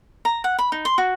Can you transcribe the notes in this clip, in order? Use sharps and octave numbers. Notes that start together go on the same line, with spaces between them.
A#5
F#5
B5
D#4
C6
F#4